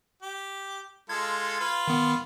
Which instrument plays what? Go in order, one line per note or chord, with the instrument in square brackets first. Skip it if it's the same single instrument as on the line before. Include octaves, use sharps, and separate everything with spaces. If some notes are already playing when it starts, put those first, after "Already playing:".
[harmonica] G4
[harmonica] G#3 F4 A4 [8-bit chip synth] G#6
[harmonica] F4 B4
[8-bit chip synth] D#3 B3